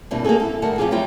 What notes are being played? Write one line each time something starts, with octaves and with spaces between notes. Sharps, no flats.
E2 B2 G3 A#3 C4 D4
A#3 D#4 F#4 G#4 A4
E4 A4
D2 G3 A#4 F#5 A5
F3 C4 F4 G4 G#4
F#3 G3 E4 F4 G5